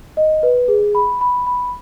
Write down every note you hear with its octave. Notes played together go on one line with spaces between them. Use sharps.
D#5
B4
G#4
B5
B5
B5